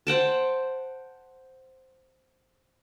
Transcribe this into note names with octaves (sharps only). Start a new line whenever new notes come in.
C5 F#5 G5 A5